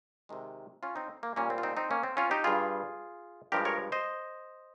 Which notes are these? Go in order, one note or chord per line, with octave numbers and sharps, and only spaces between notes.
C3 D#3 G#3
C#4 F4
C4 D#4
A#3
A#2 G3 A#3 C#4
C4
F4
C4 D#4
C4 D#4
A#3 C#4
C4
C#4 F4
D#4 G4
G2 G3 F4 G#4
G2 F3 G#3 G4 A#4
A#4 C#5
C5 D#5